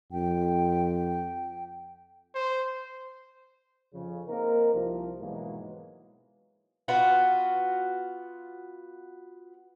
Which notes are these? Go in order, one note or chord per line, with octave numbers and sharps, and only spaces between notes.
F2 G5
C5
F2 C#3
A#3 C4 D#4 A#4
C2 F3
G#2 B2 E3 F#3 G#3 A#3
B3 F4 F#4